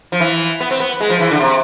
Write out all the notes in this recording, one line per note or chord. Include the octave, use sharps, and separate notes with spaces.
F3
E3
B3
C4
B3
G#3
F3
E3
D3
C3